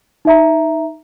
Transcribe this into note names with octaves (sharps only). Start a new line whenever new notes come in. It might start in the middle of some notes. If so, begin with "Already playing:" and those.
D#4 E5 A#5